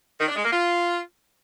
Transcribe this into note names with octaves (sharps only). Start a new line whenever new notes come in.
D#3
D4
G#3
A#3
F4